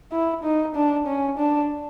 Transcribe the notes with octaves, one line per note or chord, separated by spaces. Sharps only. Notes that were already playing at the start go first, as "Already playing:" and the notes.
E4
D#4
D4
C#4
D4